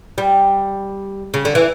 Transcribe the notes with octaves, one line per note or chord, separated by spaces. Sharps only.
G3
C#3
D3
E3